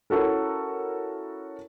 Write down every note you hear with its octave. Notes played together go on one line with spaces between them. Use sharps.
C#4 E4 F#4 A4 A#4